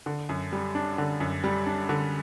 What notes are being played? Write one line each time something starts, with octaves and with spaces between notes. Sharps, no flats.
D3
F#2
G3
D4
D3
F#2
G3
D4
D3